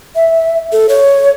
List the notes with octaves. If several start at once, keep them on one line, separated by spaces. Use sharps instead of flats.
E5
A4
C#5